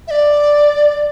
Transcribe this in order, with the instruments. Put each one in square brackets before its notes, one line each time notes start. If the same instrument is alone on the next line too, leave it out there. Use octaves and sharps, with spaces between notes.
[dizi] E5
D5